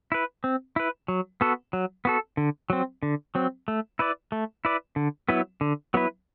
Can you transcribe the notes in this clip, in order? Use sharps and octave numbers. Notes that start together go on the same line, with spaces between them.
E4 B4
C4
E4 B4
F#3
B3 F#4 A4
F#3
B3 F#4 A4
D3
F#3 C4
D3
F#3 C4
A3
E4 B4 D5
A3
E4 B4 D5
D3
F#3 B3 E4 B4
D3
F#3 B3 E4 B4